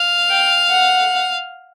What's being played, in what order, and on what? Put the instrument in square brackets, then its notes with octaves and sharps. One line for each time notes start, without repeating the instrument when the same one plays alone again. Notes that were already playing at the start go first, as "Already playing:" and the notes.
Already playing: [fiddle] F5
[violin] G5
F#5